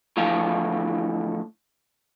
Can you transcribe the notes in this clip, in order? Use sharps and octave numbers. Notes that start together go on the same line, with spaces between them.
A2 D3 E3 F3 F5